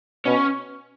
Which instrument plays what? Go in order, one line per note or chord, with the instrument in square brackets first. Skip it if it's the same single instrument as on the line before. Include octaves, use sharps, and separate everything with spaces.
[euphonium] B2 [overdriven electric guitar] C#4